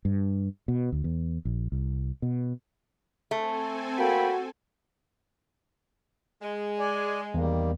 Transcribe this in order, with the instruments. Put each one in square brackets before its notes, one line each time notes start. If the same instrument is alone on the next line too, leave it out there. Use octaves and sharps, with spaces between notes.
[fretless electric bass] G2
B2
D2
E2
A#1
C2
B2
[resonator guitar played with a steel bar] A3 [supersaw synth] C4 A4 G#5
[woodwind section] A#3 G5 B5 [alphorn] F#4
[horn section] G#3
[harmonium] D5 G#5
[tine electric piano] E2 [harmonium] D#3 G3 A#3